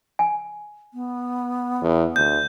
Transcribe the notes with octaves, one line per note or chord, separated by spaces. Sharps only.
G#5
B3
E2
D2 G6